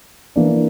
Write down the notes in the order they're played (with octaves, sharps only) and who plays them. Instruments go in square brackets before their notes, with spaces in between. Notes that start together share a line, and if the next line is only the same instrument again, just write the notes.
[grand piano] E3 A#3 D4